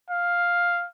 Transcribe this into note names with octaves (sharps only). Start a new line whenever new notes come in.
F5